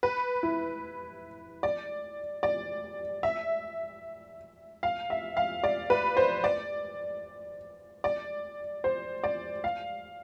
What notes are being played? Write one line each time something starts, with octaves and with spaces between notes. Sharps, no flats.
B4
E4
D5
D5
E5
F5
E5
F5
D5
B4
C5
D5
D5
C5
D5
F5